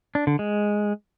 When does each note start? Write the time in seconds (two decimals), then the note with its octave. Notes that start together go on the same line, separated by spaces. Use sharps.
0.15 D4
0.27 D3
0.39 G#3